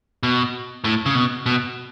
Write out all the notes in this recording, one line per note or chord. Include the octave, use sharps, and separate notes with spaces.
B2
A2
C#3
B2
B2